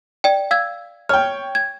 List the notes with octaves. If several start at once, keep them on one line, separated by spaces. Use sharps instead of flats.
D5 G5
F5 E6 G#6
C#5 G5 F6
G#6